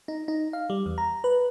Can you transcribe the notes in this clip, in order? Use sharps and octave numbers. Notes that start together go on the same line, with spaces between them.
D#4
D#4
F5
G3
E2
A#5
B4